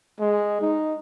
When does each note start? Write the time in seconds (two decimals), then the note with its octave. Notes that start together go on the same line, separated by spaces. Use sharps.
0.20 G#3
0.61 D#4